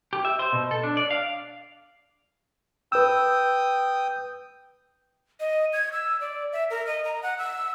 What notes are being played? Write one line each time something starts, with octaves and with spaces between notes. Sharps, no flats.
G4
E5
C5
B2
A4
D4
D5
F5
B4 G5 D#6 E6
D#5
G#6
E6
D5
E5
A#4
D#5
A#5
F#5
E6